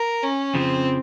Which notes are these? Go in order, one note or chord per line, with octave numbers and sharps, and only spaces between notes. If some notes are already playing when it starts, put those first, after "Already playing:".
Already playing: A#4
C#4
F2 C#3 F3 C4